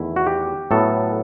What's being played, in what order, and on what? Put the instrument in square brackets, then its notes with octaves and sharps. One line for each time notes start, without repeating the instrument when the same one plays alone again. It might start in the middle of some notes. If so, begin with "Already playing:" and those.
Already playing: [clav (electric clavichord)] E2 D#3 A3 E4
F#4
G4
A2 F#3 B3 A4